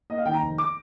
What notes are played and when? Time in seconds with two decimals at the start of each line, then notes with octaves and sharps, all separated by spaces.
0.10 A#3 D#5
0.18 F5
0.26 D#3 G5
0.34 A#5
0.42 F1
0.58 D6